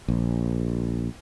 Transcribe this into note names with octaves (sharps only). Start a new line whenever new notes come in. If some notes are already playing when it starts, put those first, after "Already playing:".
A#1